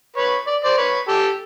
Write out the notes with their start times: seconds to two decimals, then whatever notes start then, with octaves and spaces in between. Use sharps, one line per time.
0.16 B4 C#5
0.47 D5
0.64 C5 D5
0.77 B4 C#5
1.08 G4 A4